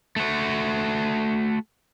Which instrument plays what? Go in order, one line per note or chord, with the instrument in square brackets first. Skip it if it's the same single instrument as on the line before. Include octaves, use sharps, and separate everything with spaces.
[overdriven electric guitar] A3 F#4